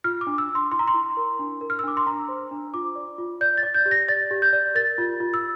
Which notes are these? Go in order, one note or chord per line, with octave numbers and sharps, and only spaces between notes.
F4 F6
D6
D4
E6
D4
C6
E4 C6
A#5
C6
E4
A#4
D4
A#4
F6
E6
D4 D6
C6
D4 A#5
C5
D4
F4 D6
D5
F4
D5 G6
A6
D5
G6
G4
A#6
D5 A6
G4
G6
D5
A#4 A6
F4
F4
E6